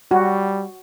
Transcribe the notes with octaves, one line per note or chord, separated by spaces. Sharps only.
G3 F#4